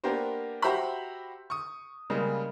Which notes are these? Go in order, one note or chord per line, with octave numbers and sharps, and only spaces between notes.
A#3 B3 D4 G4 A#4 C5
F#4 G4 C5 E5 A#5 B5
C#6 D#6
C#3 G3 G#3 A#3